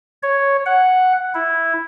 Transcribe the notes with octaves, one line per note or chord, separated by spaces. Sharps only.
C#5
F#5
E4